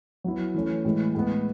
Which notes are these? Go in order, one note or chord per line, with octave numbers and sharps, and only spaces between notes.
F#3 B3 E4
E3 A3 C#4
A2 E3 G#3
A2 G#3 B3